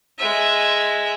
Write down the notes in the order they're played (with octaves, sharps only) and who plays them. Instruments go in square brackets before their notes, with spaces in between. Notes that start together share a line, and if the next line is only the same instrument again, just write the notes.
[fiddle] G#3 E5